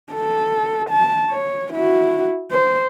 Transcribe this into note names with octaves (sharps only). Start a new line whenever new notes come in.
A4
A5
C#5
E4 F#4
C5